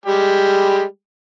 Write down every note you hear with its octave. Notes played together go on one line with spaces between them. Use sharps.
G3 G#3 G4